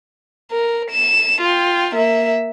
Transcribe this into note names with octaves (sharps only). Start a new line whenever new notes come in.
A#4
E7
F4 G5
A#3 E5